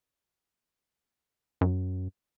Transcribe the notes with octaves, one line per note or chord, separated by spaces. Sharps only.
F#2